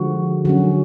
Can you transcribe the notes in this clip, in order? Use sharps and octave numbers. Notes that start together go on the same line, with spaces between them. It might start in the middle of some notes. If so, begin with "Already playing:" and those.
Already playing: D3 F3 G#3 F#4
D3 F#3 C#4 F#4